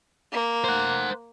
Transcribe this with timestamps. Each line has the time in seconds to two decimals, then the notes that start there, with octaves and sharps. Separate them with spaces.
0.32 A#3
0.64 C5 F#5